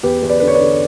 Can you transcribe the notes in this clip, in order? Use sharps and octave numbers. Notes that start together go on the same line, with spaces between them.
E2 G4 B4
E2
B4 D5
D3 B4
C#5
B4 D5
D3